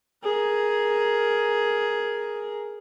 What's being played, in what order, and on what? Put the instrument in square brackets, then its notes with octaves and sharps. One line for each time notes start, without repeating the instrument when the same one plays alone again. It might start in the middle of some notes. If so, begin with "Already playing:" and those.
[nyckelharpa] G#4 A#4